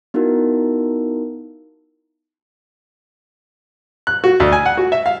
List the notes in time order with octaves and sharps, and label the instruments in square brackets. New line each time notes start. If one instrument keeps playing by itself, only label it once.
[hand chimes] B3 D#4 E4 F#4 A#4
[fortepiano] F#6
F#4
D2
G#5
F#5
F#4
E5
F5